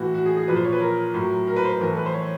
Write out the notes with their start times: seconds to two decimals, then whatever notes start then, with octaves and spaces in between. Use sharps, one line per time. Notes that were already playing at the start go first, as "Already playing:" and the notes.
Already playing: A2 E3 F#4
0.14 F#4
0.25 G#4
0.37 G#4
0.48 A#2 F3 B4
0.56 C5
0.64 C#5
0.73 B4
0.81 A#4
1.14 A2 F#3
1.47 A#4
1.56 B4
1.65 C5
1.73 B4
1.81 A2 E3 A#4
1.90 A4
1.97 B4
2.06 C5
2.14 C#5